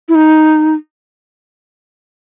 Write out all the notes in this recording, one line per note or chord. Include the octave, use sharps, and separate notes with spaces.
E4
D#4